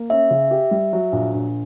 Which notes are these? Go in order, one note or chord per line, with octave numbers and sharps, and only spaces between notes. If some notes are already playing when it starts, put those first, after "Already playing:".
Already playing: A#3
C#4 E5
C#3
G4
G3
F#3
A#1
A#1